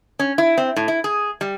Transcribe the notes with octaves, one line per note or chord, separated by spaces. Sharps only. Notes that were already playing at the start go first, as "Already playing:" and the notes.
C#4
E4
C4
A2
E4
G#4
G3